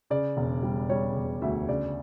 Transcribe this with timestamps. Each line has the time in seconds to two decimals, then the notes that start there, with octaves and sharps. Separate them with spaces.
0.10 C#3 D5
0.37 E1
0.63 G3
0.90 G3 C#5
1.17 E1
1.42 D2 E5
1.69 C#3 D5